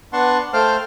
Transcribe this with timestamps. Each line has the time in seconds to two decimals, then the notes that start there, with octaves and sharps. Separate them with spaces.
0.13 B3 D4 F#5 A5 C6 C#6
0.53 A3 C5 F5 G5 A5 F6